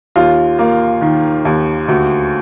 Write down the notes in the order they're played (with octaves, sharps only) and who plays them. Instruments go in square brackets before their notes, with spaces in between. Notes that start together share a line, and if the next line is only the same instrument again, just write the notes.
[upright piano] D#2 F4
A#3
D#3
D#2
D2